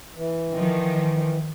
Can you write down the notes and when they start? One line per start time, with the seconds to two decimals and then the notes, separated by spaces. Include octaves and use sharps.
0.16 E3
0.55 D#3 F3